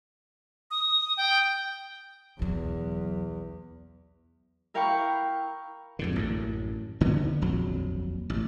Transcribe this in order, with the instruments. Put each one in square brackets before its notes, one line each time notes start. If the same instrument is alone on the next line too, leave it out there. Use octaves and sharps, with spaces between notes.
[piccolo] D#6
G5
[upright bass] B1 F#3 [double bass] E2
[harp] E4 A#4 F5 G5 B5 C#6
[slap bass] F2 G#2 D3
A1 F#2
F#1 D2 D3 B3
D#1 A#1 F2 F#3
A1